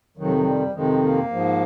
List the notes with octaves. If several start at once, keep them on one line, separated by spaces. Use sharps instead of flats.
F2 C3 D#3 F#3
F#3
G3
F2 C3 D#3 G#3
A#3
G#2 F3